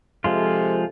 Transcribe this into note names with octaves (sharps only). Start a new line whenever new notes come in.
C3 F3 G#3 F4 A4